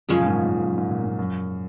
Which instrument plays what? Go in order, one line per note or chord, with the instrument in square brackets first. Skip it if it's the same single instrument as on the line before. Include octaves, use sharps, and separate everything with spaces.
[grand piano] F#2 [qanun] C#3 F3 G#3 C#4
[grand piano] A#2
G#2
G#2
F#2
G#2
A#2
G#2
F#2